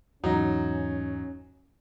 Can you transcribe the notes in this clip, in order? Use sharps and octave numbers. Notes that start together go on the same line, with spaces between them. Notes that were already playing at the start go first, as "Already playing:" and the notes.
E2 G#2 F#3 C#4 D#4